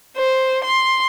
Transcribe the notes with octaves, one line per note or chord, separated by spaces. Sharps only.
C5
C6